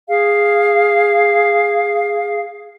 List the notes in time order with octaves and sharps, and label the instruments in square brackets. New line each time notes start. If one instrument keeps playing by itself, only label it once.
[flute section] G#4 F5